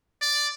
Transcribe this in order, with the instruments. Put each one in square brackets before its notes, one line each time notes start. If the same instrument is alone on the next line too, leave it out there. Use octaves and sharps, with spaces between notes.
[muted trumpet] D5